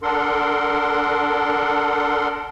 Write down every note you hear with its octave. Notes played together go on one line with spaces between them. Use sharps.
D4 A4 A#4 F#5 C6